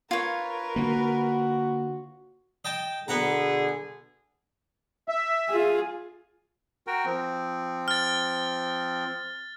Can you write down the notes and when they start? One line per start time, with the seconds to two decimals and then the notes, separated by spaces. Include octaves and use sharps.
0.11 F4 A#4 B4 C#5
0.76 D3 A#3 F#4
2.65 D#5 G5 A5
3.08 B2 D3 B3 G#4 F#5 A#5
5.08 E5
5.49 F4 G#4
6.87 F#4 A#4 G5
7.05 F3 C4
7.88 F6 A6